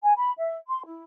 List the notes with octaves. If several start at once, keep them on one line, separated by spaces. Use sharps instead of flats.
G#5
B5
E5
C6
E4